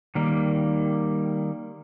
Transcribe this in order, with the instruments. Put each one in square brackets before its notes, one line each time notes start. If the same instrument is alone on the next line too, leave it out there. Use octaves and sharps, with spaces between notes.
[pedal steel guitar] D#3 G3 A#3